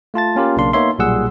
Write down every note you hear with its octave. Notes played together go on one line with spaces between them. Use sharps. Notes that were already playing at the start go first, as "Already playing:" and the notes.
A3 F4 A5 A6
A#3 C#4 F4 G4 A#4
B1 C#3 A#3 D4 C6
A#3 B3 D#4 C#5 E5 C6
B1 A#2 G3 G#4 F#5 E6